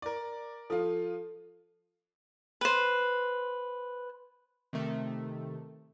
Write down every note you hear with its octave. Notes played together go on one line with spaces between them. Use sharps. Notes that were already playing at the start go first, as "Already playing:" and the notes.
A#4 D5
F3 F4 A4
B4 C5
C3 D#3 A3